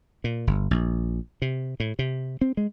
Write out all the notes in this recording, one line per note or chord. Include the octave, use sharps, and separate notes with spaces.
A#2
G1
A#1
C3
A2
C3
C4
G#3